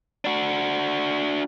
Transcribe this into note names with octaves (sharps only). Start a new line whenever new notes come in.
D4 F#4